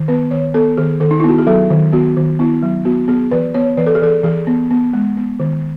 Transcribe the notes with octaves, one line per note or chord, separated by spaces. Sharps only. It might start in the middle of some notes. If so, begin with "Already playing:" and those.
Already playing: D#3
B3 B4
D#3 C#5
B3 A4
D#3 G#4
D#3 A4
D#4
E4
B3 F#4
G#4
F#3 A4
D#3
B3 F#4
D#3
B3 E4
F#3
B3 F#4
B3 G#4
E3 B4
B3 C#5
E3 B4
A4
G#4
E3 A4
E3 G#4
B3
B3
G#3
B3
D#3